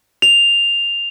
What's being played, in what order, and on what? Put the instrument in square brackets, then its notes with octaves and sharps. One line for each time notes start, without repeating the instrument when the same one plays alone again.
[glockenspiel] F7